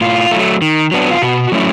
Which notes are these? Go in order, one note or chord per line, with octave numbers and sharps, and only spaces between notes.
A2 F4
F#3 A3
D#3
F#3 B3 D4
F4
B2 F#4
F#3 A3 C#4 E4